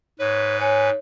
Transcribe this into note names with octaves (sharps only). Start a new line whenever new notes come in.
G#2 B4 C#5
C#5 G#5